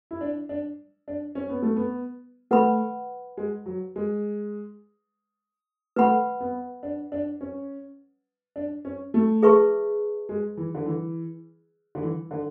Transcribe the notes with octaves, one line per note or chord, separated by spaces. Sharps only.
E4
D4
D4
D4
C#4
B3
A3
B3
A3 B4 F#5 B5
G#3
F#3
G#3
A3 B4 F#5 B5
B3
D4
D4
C#4
D4
C#4
A3
G#4 B4 E5 A5 C#6
G#3
E3
D3
E3
D3
E3
D3